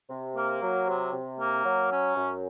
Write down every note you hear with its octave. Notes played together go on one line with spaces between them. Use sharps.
C3
A#3
F#3
C3
C3
A#3
F#3
C#4
F#2